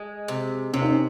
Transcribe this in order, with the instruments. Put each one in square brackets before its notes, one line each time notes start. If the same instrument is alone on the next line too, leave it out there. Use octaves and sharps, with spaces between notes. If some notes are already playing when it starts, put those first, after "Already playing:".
Already playing: [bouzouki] G#3
C3
[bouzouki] C3 [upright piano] C#4
[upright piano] D#4
C#4